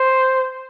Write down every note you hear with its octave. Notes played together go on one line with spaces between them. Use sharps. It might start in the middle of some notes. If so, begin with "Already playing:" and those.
Already playing: C5